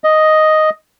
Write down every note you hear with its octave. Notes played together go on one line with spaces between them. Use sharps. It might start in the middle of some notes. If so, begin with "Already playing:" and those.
D#5